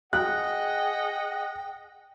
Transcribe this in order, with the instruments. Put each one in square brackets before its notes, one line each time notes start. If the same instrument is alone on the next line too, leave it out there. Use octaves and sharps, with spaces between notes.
[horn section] G#4 D#5 F#5 [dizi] G5 [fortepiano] F#6